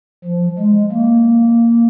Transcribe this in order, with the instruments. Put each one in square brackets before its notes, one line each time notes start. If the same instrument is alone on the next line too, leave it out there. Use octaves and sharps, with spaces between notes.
[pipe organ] F3
G#3
A#3